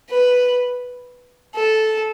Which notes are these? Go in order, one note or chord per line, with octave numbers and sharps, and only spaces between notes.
B4
A4